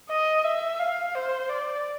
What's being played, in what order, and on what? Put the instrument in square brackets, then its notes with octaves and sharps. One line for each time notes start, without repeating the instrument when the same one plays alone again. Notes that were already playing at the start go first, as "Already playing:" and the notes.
[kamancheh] D#5
E5
F5
C5
D5